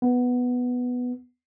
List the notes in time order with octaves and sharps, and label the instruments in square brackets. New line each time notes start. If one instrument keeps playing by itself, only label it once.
[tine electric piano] B3